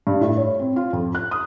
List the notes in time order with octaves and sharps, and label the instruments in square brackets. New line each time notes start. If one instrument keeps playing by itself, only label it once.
[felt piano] G2
A2
C#5
C4
F4
F2
F#6
D#6